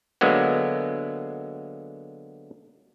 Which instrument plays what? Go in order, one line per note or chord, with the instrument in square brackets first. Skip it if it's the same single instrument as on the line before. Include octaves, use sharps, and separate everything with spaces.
[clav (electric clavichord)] D3 F#3 G#3 A#3 B3